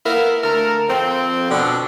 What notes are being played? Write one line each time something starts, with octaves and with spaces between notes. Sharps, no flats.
A#3 B3 E4 A#4
D2 A4 A#4
F2 C4
B2 D3